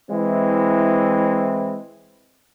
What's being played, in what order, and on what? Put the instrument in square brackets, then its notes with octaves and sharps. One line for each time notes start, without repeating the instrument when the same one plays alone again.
[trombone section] E3 G#3 C4 E4